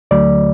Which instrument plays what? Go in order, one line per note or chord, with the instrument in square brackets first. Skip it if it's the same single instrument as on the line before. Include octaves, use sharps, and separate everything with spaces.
[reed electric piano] D2 D3 F#3 A3 D5